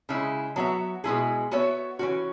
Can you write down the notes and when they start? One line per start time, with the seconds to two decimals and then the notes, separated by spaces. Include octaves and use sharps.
0.09 C#3 G#3 E4
0.56 F#3 B3 F#4 E5
1.04 B2 G#3 E4 G#4
1.51 B3 F#4 C#5 E5
1.99 E3 C#4 F#4